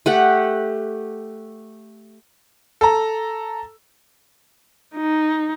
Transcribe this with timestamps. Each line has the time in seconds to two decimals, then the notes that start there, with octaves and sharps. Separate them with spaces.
0.06 A3 G4 F#5
2.81 A4 A#5
4.96 D#4